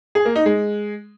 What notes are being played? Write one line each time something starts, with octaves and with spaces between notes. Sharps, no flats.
G#4
A#3
D#4
G#3